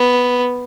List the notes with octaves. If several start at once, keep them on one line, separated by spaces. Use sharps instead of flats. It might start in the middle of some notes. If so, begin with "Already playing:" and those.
Already playing: B3